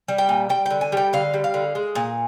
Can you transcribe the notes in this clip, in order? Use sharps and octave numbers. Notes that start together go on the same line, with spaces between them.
G3
G5
A#2
G3 G5
D3 G5
G#5
G3 G5
D3 F5
G3
F5
D3
G#3
A#2